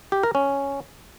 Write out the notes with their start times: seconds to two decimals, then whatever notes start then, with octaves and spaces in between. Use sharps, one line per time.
0.12 G4
0.23 A#4
0.35 C#4